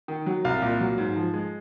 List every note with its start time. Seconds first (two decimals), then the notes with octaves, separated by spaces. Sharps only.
0.08 D#3
0.26 F#3
0.45 C2 F5
0.62 A#2
0.80 F#3
0.98 G#2
1.16 F3
1.34 G#3